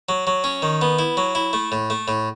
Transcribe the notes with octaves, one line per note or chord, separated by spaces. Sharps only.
F#3
F#3
C#4
D#3
B3
E4
F#3
E4
A3
A2
A3
A2